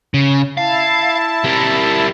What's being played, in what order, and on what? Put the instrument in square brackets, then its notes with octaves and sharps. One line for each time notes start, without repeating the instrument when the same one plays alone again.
[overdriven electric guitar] C#3
[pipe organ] E4 A5 [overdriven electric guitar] F5
[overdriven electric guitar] G3 A#4